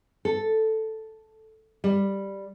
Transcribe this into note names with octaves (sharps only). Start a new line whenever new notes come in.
A4
G3